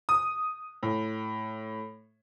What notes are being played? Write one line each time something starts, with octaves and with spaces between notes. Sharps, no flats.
D#6
A2